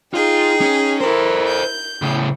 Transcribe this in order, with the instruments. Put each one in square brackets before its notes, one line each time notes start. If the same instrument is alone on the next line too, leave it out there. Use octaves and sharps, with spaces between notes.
[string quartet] D#4 G#4 G5 [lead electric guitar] F4
[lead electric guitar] C#4
[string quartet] E4 A#4 [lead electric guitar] A4 C5
[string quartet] G6
[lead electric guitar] A2 C#3